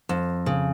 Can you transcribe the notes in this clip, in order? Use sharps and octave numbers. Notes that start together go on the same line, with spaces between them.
F2
C#3